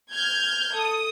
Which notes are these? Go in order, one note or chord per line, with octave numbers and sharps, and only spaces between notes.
F6 G6 G#6
A4 D#6